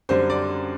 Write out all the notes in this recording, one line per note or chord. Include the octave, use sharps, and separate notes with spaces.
F#2 D3 G3 C4 C5
D5